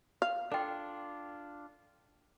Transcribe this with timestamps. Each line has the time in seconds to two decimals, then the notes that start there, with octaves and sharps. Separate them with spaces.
0.22 F5
0.52 D4 F4 A4 G5